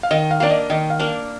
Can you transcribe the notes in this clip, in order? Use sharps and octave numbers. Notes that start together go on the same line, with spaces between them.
F5
D#3 D#5
F5
A#3 D4 D5
D#5
D#3 D#5
F5
A#3 D4